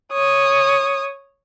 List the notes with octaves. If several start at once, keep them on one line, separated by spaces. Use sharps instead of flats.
C#5 D#6